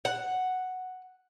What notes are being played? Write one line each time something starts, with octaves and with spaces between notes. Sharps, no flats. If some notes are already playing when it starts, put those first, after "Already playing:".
F#5